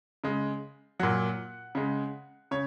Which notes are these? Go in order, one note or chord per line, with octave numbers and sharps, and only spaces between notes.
C#3 G#3
A#2 F#3 F#5
C#3 G#3
C#3 C#5